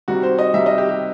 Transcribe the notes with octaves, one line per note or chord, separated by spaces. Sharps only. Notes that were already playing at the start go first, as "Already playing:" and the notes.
C3 D#3 G3 F#4
C5
D#5
C3 D#3 G3 E5
D#5
G4
G4